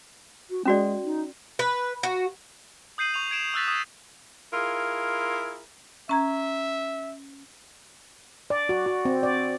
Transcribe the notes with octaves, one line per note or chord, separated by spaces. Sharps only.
F#4
G#3 C#4 F#4 D5
D#4
B4
F#4
D#6 G6 C7 D#7 F#7
C#6 F7
G#6 D7 E7 F7
D#6 E6 F#6 A6 B6
D#6 E7
E4 F4 G#4 A#4
C#4 E5 A#5 G#6
D5
F#4
F#4
C4
D5